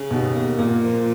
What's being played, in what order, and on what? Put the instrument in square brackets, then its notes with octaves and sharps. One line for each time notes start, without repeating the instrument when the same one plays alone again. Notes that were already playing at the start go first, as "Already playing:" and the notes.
Already playing: [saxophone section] C#3
[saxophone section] D#2 [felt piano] B2
[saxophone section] A#3
[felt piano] A#2 [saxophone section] A#3
[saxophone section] F3